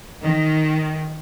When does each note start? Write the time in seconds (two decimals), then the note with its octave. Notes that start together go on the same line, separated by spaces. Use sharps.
0.24 D#3